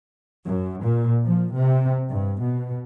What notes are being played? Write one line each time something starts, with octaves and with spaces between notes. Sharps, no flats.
F#2
A#2
F3
C3
G2
B2